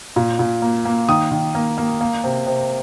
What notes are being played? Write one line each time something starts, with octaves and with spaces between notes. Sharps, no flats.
A#2
A#2
A#3
A#3
D#3 D#6
D#3
A#3
A#3
A#3
C3
C3